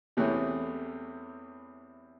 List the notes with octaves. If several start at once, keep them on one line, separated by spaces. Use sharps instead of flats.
E2 C3 E3 A3 C#4